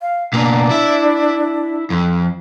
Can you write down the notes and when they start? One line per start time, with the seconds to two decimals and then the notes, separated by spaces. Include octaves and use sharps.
0.01 F5
0.33 B2 A#3 D4
0.71 E4 E5
1.90 F2